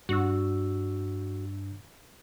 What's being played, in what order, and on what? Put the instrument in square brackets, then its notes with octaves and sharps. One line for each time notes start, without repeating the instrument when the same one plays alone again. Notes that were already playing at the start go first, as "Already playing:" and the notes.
[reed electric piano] G2 D4 E6 [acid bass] F#4